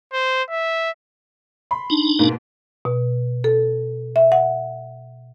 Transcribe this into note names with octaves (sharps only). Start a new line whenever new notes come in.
C5
E5
B5 C6
D4 D#4
G#2 B2 A#3
B2
A4
E5
F#5